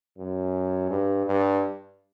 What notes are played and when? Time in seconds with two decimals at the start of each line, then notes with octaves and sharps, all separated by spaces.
0.18 F#2
0.90 G2
1.27 G2